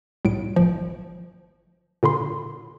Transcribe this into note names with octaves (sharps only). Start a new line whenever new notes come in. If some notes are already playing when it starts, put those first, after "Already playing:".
C2 A2 D7
G1 F3
A#2 D3 B5 C6